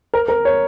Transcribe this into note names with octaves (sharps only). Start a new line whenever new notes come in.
A#4
A#4
C#5